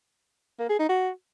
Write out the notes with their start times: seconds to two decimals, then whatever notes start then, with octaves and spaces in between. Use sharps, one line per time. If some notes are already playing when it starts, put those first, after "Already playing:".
0.59 A#3
0.69 G#4
0.79 D#4
0.89 F#4